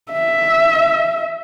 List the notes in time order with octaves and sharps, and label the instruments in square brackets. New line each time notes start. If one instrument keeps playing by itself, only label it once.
[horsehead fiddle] E5